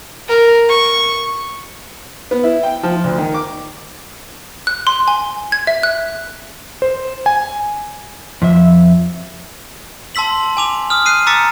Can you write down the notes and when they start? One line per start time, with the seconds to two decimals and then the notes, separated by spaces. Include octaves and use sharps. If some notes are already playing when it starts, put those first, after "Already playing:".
0.29 A#4
0.69 C#6
2.31 B3
2.44 E4
2.63 G5
2.83 F3
3.04 D2
3.18 D#3
3.34 D6
4.67 F#6
4.87 C6
5.08 G#5
5.52 G#6
5.67 E5
5.83 F#6
6.82 C5
7.26 G#5
8.42 F2 F3 E5
10.15 A5 C6 E6 B6 F#7
10.57 G#5 D6 F7
10.90 D#6 F6
11.06 F#6 C7 D#7
11.27 A#5 D6 E6 A6 B6 C#7